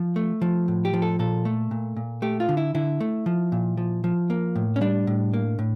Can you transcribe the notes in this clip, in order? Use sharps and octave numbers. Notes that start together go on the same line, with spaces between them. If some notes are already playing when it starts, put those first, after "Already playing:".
Already playing: F3
A3
F3
A2
G4
F3
A4
A#2 A4
A3
A#2
A#2
A3 G4
F4
D3
E4
D3 E4
A3
F3
A#2
F3
F3
A#3
A2
C#4
G3 D4
A2
A#3
A2